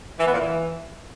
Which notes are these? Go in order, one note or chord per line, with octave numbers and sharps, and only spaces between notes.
E3
B3
A#2
E3